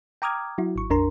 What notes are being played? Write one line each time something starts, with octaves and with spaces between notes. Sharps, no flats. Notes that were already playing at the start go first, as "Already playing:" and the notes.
G5 A#5 D6 D#6 F6 G#6
F#3 E4 F#4
G#1 C#6
A#1 F2 D4 A#4 A#5 C6